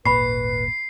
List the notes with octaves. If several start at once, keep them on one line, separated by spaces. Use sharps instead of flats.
D#1 G#1 A#2 B4 B5 C#6 C7